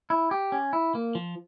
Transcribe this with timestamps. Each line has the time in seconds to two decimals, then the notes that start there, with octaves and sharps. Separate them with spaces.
0.10 E4
0.31 G4
0.52 C#4
0.73 E4
0.95 A#3
1.15 F3